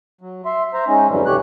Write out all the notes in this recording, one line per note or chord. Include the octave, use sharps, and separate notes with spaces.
F#3
E5 C6
C5 E5 A#5
G#3 C#4 D#4
F2 G#2 C#3 E3 F#3 G3
D2 C3 A3 G4 C#5 F#6